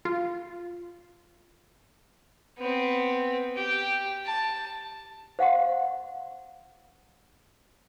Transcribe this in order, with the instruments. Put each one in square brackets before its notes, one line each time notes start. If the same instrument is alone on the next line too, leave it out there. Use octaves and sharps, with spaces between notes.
[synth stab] F4
[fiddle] B3 C4
G4
A5
[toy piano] C5 F5 F#5 C6